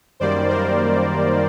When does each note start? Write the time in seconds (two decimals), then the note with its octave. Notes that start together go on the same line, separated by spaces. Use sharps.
0.20 F#2 D#3 G3 A#3 C5 D5
0.50 A#4 C5